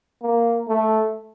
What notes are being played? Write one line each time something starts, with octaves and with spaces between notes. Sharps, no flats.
A#3
A3